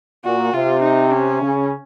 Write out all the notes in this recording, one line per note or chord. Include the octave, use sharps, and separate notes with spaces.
A#2 F#4
C3 F4
D#4
C#4
C#3